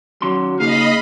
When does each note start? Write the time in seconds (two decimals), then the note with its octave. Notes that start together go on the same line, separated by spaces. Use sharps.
0.22 D#3 F#3 C#4 C6
0.60 C#3 A#3 D#4 G#4 D#5 F5 B5